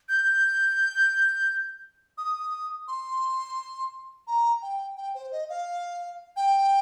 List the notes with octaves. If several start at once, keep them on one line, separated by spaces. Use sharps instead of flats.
G6
D#6
C6
A#5
G5
G5
C5
D#5
F5
G5